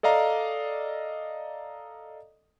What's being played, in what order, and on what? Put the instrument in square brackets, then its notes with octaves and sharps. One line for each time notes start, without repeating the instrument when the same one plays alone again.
[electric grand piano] A4 D5 D#5 F5 A#5